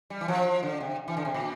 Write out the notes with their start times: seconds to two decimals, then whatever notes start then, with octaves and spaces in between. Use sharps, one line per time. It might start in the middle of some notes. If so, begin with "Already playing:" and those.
0.10 G3
0.21 E3
0.28 F3
0.63 D3
0.80 C3
1.08 E3
1.17 D3
1.25 C3
1.34 A#2